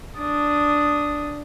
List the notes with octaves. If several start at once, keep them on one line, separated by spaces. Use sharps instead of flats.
D4 D#6